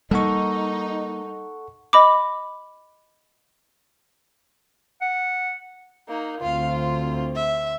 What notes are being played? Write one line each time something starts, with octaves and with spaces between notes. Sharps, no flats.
G3 A#3 D#4 A4 F#5 C#6
D#5 B5 D6
F#5
A#3 D#4
D2 C4 F4 F5
F4
E5